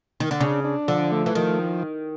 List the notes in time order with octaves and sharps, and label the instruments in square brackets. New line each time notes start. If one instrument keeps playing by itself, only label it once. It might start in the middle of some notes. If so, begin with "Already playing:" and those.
[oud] D#3
D3
[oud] C#3 [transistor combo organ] D4
[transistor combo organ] D4
[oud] D3 [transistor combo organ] F3
[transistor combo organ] A3
[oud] E3
[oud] D#3 [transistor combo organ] F3